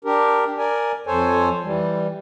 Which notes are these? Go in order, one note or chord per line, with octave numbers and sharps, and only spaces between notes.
D4 G4 A#4
A#4 D5 G#5
F2 A4 C5 C#5 G#5
E3 G3